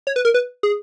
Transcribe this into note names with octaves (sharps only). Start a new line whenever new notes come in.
C#5
B4
A#4
B4
G#4